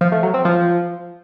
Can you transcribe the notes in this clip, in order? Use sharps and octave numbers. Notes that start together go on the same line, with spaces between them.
F3
A3
F#3
C4
F3